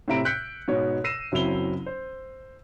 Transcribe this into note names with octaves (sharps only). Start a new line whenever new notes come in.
A2 C3 C4 E5 A#5 D7
E6 F#6 G6 B6 C#7
G#2 B2 C#5
E6 A#6 C7 D#7 E7
F#1 F#3 C4 E4 F7 G7
C5